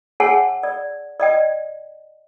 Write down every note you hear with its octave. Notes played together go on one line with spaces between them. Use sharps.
G#4 C#5 F#5 G#5 A5
D5
D5 D#5 G5